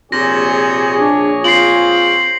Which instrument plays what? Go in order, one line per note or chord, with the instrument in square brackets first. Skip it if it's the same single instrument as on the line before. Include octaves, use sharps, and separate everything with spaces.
[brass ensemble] A#1 G#4 C#5 [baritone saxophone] C3 [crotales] A#6
[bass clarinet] D4
[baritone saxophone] C4 [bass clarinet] F4 [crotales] C7 F#7